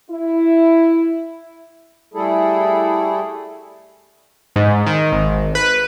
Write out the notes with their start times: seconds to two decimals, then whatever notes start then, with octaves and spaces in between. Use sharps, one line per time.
0.11 E4
2.14 G3 A3 E4 G#4 A4
4.56 G#2
4.86 D#3
5.12 G#1
5.55 B4